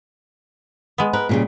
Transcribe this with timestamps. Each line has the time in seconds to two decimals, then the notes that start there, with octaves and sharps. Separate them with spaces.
0.98 G#3 B3
1.13 A#4 B4
1.29 A#2 C#3 G3